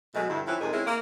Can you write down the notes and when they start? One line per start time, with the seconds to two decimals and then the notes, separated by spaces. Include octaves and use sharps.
0.15 B2 F#3 G#3 A3
0.30 G2 D3 G3 E4
0.47 E3 F3 C4 C#4 E4
0.61 F2 C3 G#3 D#4 G#4 A#4
0.73 G#3 C4 C#4 E4
0.86 A#3